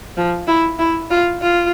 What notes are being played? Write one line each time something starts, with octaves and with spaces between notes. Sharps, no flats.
F3
E4
E4
F4
F4